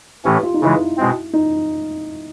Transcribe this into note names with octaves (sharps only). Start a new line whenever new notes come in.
A2 E3 A3 C#4 G4
F4
D#4
C#3 E3 G#3 E4
B2 G#3 C4
D#4